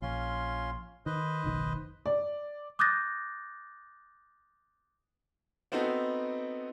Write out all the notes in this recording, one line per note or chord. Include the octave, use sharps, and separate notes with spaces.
A#1 C#4 F4 C6
D#3 B4 C5 D#5
F#1 B1 D#3
D5
D6 D#6 F#6 G6 A6 A#6
B3 C4 D#4 F#4 A4